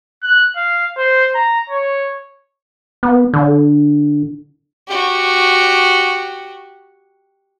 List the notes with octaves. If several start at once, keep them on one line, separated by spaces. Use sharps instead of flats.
F#6
F5
C5
A#5
C#5
B3
D3
F#4 G4